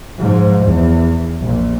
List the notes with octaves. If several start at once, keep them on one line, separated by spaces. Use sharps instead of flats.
G#2 F3
E2
A#1 A#2